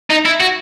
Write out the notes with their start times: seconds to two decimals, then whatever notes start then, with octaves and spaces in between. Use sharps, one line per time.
0.10 D#4
0.26 E4
0.41 F#4